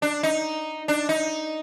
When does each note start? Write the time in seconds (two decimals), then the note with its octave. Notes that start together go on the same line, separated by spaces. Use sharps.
0.02 D4
0.23 D#4
0.88 D4
1.09 D#4